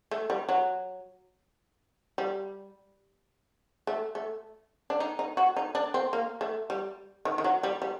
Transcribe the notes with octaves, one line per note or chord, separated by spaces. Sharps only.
A3
G3
F#3
G3
A3
A3
D4
D#4
D#4
F#4
D#4
D4
C4
A#3
A3
G3
D#3
D#3
F#3
G3
G3